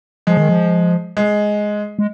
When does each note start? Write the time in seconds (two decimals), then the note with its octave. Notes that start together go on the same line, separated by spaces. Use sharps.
0.27 F3 G#3
0.37 D#3
0.49 F3
1.17 G#3
1.99 G#3